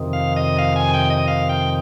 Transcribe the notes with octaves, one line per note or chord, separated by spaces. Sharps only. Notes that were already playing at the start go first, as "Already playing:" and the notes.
Already playing: F2 C3 D#3
F5
D#5
F5
G#5
G5
D#5
F5
G5